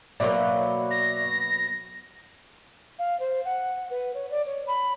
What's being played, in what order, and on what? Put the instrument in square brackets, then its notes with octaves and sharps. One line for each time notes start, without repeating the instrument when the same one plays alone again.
[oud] B2 F#3 A#3 [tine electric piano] D5 E5 D6
[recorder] A#6
[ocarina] F5
C5
F#5
B4
C#5
D5
C#5
B5